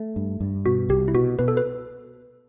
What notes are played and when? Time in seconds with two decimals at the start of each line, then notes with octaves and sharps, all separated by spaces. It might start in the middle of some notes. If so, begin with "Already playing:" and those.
Already playing: A3
0.16 G2
0.41 G2
0.66 B2 F#4
0.89 C2 G4
1.08 E4
1.14 B2 F#4
1.39 B2 B4
1.48 A4
1.57 B4